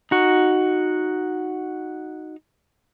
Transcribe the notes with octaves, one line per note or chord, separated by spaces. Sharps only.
D#4 F#4